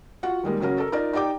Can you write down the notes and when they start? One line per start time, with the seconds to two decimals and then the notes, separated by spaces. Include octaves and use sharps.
0.23 F4 F#4 F#5
0.43 D#3 G3 G#3 A#3
0.60 C#3 F#3 C#4 F#4 A#4
0.78 A4 A#4
0.92 D#4 F4 A#4 D5
1.13 D#4 G4 D5 G5 D6